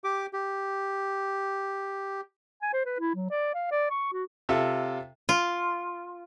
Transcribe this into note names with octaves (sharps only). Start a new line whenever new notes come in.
G4 D6
G4
G#5
C5
B4
E4
F#3
D5
F5
D5
C#6
F#4
C3 F4 A4 E5
F4